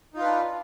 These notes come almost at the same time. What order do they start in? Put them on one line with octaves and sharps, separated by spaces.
D#4 F4 F5 B4 D4